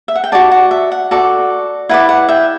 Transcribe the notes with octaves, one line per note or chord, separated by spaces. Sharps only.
E5
F#5
G5
F#4 A4 D5 F#5 A5
F#5
E5
F#5
F#4 A4 D5
E4 B4 D5 F#5
F#5
E5 G5